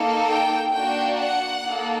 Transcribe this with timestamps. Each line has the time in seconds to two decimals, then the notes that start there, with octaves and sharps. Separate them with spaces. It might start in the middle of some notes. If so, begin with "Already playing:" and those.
Already playing: A#3 D#4 A4
0.27 G5
0.72 A#3 D4 F#4 G5
1.18 F#5
1.64 A#3 D#4 A4